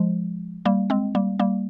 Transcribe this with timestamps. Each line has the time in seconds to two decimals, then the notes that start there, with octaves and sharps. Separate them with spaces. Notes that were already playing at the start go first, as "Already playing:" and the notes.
Already playing: F3 G#3
0.65 G3 A#3
0.90 G#3 C4
1.15 G3 A#3
1.39 G3 A#3